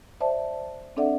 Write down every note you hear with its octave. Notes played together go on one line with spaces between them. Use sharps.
C5 D5 E5 A5
C4 D4 A4 D5 E5 F#5